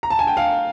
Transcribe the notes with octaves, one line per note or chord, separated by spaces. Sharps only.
A#5
A5
G#5
G5
F5